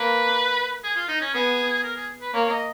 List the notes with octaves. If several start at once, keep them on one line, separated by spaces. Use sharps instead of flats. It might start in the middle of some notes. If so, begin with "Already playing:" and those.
Already playing: A#3 B4
G#4
F4
D#4
C#4
B3 G#4
A#4
G#4
B4
A#3 C#5
D#5